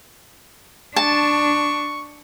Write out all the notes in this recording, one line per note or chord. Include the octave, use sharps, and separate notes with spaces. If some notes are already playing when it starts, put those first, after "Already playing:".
D4 A5 C#6